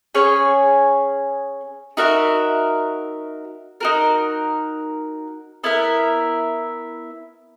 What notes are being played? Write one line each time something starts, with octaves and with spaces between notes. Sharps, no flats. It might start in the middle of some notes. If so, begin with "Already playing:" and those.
C#4 G#4 C#5 G#5
D#4 F#4 A#4 E5
D#4 F#4 A#4
B3 E4 A#4 E5